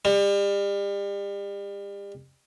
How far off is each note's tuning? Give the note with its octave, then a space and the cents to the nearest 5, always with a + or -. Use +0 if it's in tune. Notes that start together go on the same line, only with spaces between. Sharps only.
G3 +35